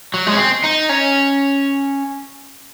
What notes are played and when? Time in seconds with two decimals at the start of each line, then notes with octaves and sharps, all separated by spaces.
0.14 F#3
0.27 G#3
0.33 C#4
0.38 C4
0.64 D#4
0.89 C#4